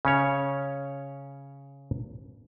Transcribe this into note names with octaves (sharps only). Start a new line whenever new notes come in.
C#3 C#4 C#5